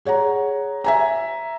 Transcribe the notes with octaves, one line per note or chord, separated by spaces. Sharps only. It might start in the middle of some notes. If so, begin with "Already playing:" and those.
G#4 C#5 F#5 A#5
E5 G#5 A#5